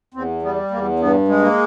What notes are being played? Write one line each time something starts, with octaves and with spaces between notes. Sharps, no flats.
E2 C4
G3 B3
E2 A#3
G2 B3
G#3
A#3